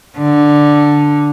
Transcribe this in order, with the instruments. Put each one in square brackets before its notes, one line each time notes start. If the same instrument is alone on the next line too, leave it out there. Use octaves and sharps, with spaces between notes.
[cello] D3